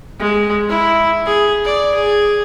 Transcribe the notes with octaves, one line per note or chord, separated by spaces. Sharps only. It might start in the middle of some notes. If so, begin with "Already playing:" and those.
G#3
E4
G#4
D5
G#4